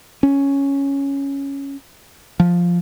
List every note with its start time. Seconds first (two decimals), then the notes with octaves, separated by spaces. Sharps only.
0.23 C#4
2.40 F3